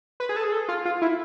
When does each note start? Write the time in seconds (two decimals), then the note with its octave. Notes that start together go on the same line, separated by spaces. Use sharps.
0.20 B4
0.29 G#4
0.36 A4
0.44 G#4
0.52 A4
0.69 F4
0.85 F4
1.02 E4